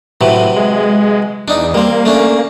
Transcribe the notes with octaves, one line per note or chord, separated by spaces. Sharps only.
A2 C3 E3 F#3
G#3
E2 D4 D#4
G3 A#3 C4
A3 C#4 D4